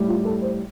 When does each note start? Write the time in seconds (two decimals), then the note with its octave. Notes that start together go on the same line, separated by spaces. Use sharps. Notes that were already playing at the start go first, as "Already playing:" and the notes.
Already playing: A2 G3
0.08 F4
0.25 A4
0.42 C5